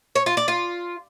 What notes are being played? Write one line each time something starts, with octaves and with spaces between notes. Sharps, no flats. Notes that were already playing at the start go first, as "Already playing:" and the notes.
C#5
F4
D5
F4